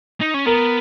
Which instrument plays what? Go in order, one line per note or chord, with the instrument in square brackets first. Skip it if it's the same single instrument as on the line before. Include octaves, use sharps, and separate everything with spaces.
[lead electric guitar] D#4
C#4
[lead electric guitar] B3 [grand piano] A#4